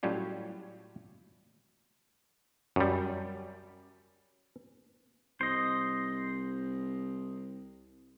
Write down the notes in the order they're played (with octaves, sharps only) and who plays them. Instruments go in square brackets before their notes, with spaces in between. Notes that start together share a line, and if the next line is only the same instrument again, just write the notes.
[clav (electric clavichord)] A2 F#3 G3 C#4 F4
F#2 G3
[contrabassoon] C2 [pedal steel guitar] C5 D#5